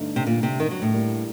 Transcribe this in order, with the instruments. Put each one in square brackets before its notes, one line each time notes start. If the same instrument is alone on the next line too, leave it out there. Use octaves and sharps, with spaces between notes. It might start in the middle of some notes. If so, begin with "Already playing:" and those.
Already playing: [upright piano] G2 D3 A3 D#4
[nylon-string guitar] C3
A#2
C3
D#3
F#3
A2
[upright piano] G3 A#3 D4